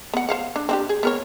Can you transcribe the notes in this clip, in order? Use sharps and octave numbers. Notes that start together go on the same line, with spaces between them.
B3 F#5
C5 F5 F#5
D4
C4 D4 G4
G#4
B3 A#4 C#5